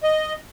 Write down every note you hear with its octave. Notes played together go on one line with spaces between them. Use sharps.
D#5